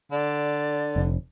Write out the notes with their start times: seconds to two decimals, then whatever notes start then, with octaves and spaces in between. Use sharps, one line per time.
0.11 D3 D5
0.96 F1